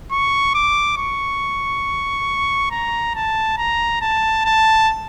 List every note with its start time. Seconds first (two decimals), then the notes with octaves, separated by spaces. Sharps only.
0.12 C#6
0.55 D6
0.98 C#6
2.71 A#5
3.15 A5
3.58 A#5
4.01 A5
4.45 A5